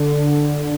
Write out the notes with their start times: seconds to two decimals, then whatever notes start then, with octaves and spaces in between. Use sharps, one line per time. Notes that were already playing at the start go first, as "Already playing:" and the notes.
Already playing: D3